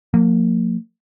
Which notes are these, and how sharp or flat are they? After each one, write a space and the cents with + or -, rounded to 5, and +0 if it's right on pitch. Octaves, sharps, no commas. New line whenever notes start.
F3 +40 A#3 -30